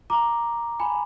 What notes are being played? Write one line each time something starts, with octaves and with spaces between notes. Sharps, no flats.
A#5 D6
G#5 B5